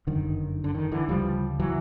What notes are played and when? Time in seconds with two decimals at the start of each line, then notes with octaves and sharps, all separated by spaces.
0.07 G1 F#2 D3 D#3
0.64 D3
0.75 D#3
0.92 D3 E3
1.09 D2 C#3 F3 G3
1.59 E3 F#3